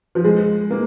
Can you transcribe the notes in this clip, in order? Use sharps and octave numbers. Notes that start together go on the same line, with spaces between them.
F3
G#3
A#3